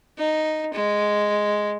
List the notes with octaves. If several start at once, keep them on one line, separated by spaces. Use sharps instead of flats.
D#4
G#3